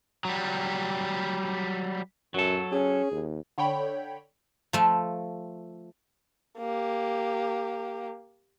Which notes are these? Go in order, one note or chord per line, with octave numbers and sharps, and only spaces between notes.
F#3 G3
F#2 F#3 A4
C#4 G#4
D#2
D3 C#5 G5 B5
F3 A3
A#3 G4